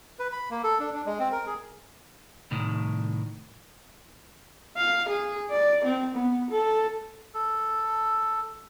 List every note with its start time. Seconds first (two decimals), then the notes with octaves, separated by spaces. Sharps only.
0.19 B4
0.32 B5
0.51 A#3
0.63 A4
0.80 D4
0.94 D4
1.06 G#3
1.19 C4
1.32 A#4
1.46 G#4
2.51 C2 A2 D#3
4.77 F5
5.08 G#4
5.51 D5
5.84 C4
6.15 B3
6.51 A4
7.34 A4